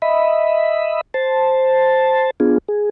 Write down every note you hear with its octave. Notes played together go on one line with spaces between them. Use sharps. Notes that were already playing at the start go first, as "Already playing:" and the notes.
D#5 E5 B5
C5 A5
B3 D4 F4 G#4
G#4